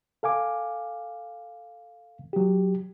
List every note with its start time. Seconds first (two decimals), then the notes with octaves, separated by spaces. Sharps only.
0.23 A4 F5 G#5 D6
2.33 F#3 G4